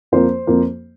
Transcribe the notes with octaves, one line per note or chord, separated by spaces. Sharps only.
F2 F3 A#3 C5
F2 F3 A#3